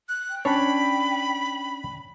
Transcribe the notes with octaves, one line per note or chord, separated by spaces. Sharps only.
F#6
G5
C#4 D4 C#5 B5